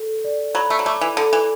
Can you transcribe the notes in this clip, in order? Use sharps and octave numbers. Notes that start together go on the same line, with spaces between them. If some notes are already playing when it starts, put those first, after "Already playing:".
Already playing: A4
D5
F#3 B5
A3
F#3
A3 D6
E3
D3 A4
E3